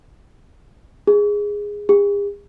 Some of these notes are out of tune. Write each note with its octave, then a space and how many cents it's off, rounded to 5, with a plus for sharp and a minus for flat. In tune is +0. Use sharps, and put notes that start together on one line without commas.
G#4 -10
G#4 -45